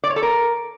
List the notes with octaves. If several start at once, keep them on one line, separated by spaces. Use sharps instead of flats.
D5
C#5
A4
A#4